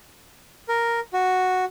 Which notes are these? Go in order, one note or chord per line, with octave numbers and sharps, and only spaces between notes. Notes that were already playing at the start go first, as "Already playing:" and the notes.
A#4
F#4